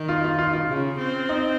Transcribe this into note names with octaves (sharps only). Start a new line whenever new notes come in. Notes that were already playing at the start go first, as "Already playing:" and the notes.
Already playing: D#3
F4
F4
F4
F4
C#3
C4
D#4